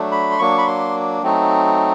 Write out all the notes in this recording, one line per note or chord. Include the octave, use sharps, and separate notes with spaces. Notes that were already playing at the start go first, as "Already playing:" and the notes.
Already playing: F#3 A3 D4
B5
C6
F#3 A#3 D4 C#6
B5
C6
F#3 A3 C4 D#4